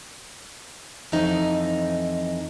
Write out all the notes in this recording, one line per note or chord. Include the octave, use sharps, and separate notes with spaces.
F2 E3 D#4